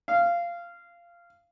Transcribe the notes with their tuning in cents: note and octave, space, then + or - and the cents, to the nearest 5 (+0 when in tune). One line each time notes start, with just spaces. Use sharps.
F5 -15